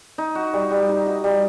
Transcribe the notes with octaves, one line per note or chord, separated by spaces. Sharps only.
D#4
F#4
G3
G3
D#4
F#4
G3